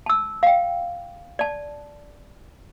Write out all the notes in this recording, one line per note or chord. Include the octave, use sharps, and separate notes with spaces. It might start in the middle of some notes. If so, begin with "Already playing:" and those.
A5 E6
F5 G5
D5 A5